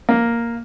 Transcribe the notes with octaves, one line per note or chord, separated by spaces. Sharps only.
A#3